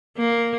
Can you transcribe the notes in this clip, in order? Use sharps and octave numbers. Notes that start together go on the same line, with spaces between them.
A#3